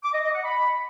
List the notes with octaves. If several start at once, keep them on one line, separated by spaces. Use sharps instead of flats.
D6
D#5
D#5
F#5
B5